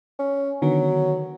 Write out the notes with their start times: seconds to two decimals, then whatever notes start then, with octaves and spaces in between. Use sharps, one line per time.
0.19 C#4
0.62 D3 D#3 F#3 B3